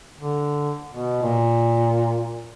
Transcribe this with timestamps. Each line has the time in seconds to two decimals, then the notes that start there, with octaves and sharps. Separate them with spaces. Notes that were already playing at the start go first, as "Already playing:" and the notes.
0.18 D3
0.91 B2
1.22 A#2